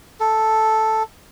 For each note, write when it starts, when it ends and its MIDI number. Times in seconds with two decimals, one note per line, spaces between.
0.20 1.03 69